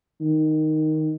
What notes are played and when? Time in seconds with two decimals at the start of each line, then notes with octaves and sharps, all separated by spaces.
0.21 D#3